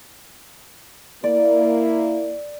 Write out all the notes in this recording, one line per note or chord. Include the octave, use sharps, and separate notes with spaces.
A#3 E4 D5